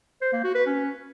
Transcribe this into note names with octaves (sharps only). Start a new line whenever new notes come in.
C5
A#3
F#4
B4
C#4